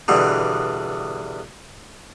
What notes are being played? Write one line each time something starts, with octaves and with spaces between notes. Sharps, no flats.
E2 G2 B2 D3